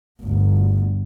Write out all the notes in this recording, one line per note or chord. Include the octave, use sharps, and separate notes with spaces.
G1 D2